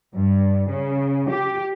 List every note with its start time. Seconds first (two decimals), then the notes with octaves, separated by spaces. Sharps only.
0.14 G2
0.70 C#3
1.29 G4